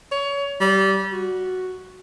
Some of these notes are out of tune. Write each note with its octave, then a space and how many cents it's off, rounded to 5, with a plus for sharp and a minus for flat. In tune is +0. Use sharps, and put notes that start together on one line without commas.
C#5 +25
G3 -20
F#4 +0